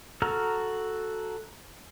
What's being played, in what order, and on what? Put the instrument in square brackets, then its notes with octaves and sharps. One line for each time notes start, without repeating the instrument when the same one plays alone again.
[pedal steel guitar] F#4 A4 A#5 F6